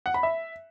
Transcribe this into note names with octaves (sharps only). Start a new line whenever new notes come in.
F#5
B5
E5